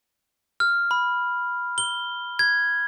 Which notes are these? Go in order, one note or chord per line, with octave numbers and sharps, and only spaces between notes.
F6
B5
G7
G#6